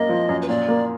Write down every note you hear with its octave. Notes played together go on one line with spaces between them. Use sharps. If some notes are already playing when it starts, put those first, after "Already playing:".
Already playing: F#2 A#3 D#5
F3
F#2
B4
A#2 D5
A#3